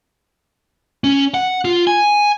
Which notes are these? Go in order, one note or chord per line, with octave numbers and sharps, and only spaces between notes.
C#4
F#5
F4
G#5